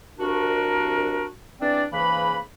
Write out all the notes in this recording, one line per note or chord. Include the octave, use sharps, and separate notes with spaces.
C2 D4 F#4 A#4
E2 E3 C4 D4 D5
G#2 C#3 E3 A#3 B4 B5